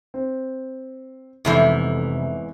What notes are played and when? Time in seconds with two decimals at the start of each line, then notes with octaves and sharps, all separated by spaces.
0.14 C4
1.45 F1 E2 G#2 E3 A4 C7